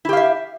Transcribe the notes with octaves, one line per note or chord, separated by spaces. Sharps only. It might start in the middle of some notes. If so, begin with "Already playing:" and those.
E4 G4 E5 F5